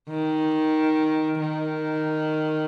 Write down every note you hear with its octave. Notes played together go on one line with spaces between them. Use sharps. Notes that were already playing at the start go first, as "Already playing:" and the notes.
D#3
D#3